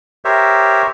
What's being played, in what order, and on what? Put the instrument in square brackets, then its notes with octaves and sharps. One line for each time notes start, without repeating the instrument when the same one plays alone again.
[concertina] G4 A#4 C5 C#5 E5